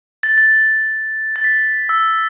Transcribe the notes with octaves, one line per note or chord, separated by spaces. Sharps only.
A6
A6
A6
B6
E6